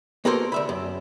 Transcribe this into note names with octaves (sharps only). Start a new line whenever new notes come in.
A#3 B3 F#4 A4 A#4 C5
D2 E5 B5
F#2